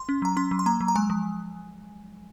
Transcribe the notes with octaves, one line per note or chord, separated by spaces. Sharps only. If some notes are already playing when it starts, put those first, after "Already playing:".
Already playing: C6
C#4
F#3 A#5
C#4 C6
F#3
C6
A#3 A#5
F#3
A#5
G#3 G#5
F3